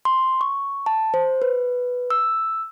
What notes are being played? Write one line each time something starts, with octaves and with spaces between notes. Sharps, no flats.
C6
C#6
A5
C5
B4
E6